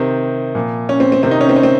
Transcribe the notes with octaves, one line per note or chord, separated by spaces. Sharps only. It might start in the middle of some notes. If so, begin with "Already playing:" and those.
Already playing: C3 D#3 C4
A#2 F3
C#4
C4
C4
C3 D#3 C4
D#4
C#4
C4
C#4
C4